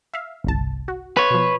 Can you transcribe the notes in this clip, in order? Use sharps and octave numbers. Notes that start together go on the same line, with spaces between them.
E5 F5
G1 C2 A5
F#4
B4 C#5
B2 F3